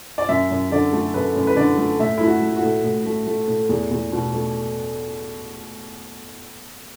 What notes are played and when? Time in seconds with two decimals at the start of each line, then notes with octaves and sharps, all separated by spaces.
0.18 D5
0.29 F#2 E5
0.51 F#2
0.72 D3 D5
0.93 A3
1.14 F#2 B4
1.36 F#2
1.47 B4
1.56 D3 D5
1.78 A3
2.00 A2 E5
2.18 A3 E4
2.27 F#4
2.42 A3
2.56 F#4
2.63 A2
2.84 A2
3.06 A3
3.27 A3
3.48 A2
3.69 E2
3.91 E2
4.12 B2
4.34 A3